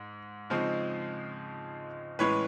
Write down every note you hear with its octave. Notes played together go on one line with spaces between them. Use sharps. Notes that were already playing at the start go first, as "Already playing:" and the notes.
Already playing: G#2
C#3 F3 G#3 C4 D#4
A2 E3 G#3 C#4 B4 C#5